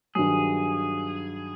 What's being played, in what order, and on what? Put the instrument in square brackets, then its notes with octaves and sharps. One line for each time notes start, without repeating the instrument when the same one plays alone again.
[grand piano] G2 D#3 F#3 [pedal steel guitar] G#4